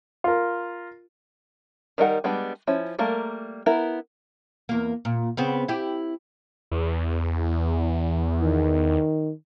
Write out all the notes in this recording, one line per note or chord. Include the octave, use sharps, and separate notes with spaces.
F4 A#4
D#3 G3 D#4 A#4 F#5
G3 G#3 B3 D4
F3 C#4 E4
G3 A3 A#3 A#4
B3 E4 A#4
E2 A#3
A#2
C#3 B3 C4
E4 G4
E2
D#3